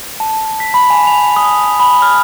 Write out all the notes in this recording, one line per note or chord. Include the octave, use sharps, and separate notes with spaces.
A5
B6
B5
G#5
F7
D#6
B5
F6